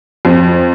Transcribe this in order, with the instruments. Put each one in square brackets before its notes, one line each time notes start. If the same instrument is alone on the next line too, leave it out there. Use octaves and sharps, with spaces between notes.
[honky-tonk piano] F2